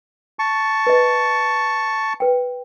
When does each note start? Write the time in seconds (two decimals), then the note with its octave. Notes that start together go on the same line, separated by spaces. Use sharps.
0.39 A5 C#6
0.87 B4 D#5
2.20 B4 G5